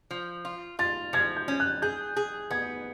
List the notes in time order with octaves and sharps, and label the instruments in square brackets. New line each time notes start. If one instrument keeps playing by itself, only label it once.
[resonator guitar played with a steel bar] F3
F4
[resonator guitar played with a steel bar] F4 [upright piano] A6
[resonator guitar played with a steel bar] F3 [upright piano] G#6
[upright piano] G6
[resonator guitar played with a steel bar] C#4
[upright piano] F#6
[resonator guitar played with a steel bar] G#4 [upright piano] G6
[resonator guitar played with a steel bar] G#4
[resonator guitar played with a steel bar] B3 [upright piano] G#6